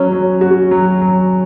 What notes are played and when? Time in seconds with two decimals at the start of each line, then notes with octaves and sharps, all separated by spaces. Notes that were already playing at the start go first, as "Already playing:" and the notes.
Already playing: F#3 C#4
0.12 F#3
0.41 F#4
0.71 F#3
1.01 F#3